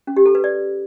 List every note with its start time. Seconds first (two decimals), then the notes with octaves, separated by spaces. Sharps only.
0.07 C#4
0.16 G4
0.26 A4
0.35 B4
0.44 D5